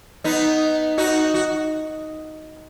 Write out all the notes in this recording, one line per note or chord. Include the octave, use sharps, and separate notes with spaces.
B3 D#4
D#4 F#4
F#4